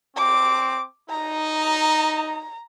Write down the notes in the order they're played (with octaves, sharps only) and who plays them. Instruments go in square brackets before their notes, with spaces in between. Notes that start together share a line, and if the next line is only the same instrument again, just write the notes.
[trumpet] C4 [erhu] D6
[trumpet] D#4 [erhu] A#5